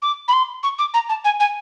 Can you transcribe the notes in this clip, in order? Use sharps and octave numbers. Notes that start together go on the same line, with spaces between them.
D6
B5
C6
C#6
D6
A#5
A5
G#5
G#5